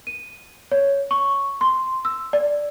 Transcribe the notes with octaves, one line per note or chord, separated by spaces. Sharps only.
D#7
C#5
C#6
C6
E6
D5